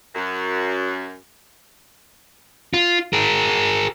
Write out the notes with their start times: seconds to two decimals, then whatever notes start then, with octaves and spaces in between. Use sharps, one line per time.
0.15 F#2
2.74 F4
3.13 G#4 A#4